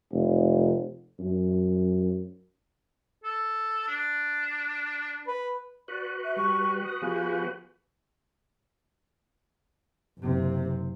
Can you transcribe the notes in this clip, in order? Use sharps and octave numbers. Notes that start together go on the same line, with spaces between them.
F1
F#2
A4
D4
B4
F#4 B4 D5
E5
G3 C#6
D#6
F3 B3 G4 G#4
F#1 C3